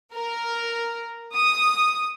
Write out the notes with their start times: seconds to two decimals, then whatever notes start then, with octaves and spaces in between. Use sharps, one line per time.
0.13 A#4
1.34 D#6